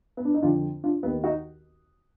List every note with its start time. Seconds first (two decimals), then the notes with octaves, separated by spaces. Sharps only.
0.17 B3
0.25 D4
0.34 D#4
0.42 F2 D3 D4 F4
0.84 D4 F4
1.03 D#2 D#3 B3
1.24 D#4 F#4